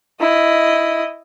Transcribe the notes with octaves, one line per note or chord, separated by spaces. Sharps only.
E4 D#5